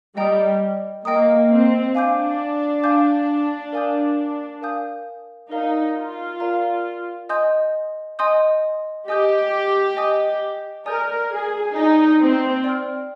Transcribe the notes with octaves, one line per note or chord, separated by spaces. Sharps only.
G3 D#5 G5 A#5 D#6
A#3 D#5 G5 A#5 D#6
C4
D4 F5 G#5 D6 G6
F5 G#5 D6 G6
A#4 F5 G#5 D#6 G6
A#4 F5 G#5 D#6 G6
D#4 A#4 D5 F5 A#5
F4
A#4 D5 F5 A#5
D#5 G#5 C6 D#6 G6
D#5 G#5 C6 D#6 G6
G4 D#5 G#5 D#6 G6
D#5 G#5 D#6 G6
A#4 D5 G#5 D#6 G6
G#4
D#4 D5 G#5 D#6 G6
C4
D5 G5 C6 F6